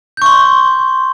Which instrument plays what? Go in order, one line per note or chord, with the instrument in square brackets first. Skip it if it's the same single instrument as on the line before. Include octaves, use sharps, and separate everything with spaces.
[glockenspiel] G6
C#6
C6